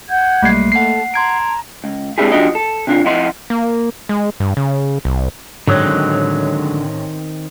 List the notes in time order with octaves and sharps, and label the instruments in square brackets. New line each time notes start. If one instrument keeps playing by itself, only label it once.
[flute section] F#5 G6 G#6
[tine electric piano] B1 G3 C7 [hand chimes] A3 A#3
[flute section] A4 A5 [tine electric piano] F#5 C7
[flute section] A5 A#5 [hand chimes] C6 G#6 D7
[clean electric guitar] C#2
G#3 C4 D4 E4 G4 G#4
B2 F3 D4 F#4 G4 D#5
A4
C3 D4 F4
F2 E4 D#5 F#5 C6
[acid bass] A#3
G#3
G2
C#3
C2
[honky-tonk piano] A1 C#5 D#6 [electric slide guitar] D3 [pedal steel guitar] D#3 C4 [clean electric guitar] F#3 G#3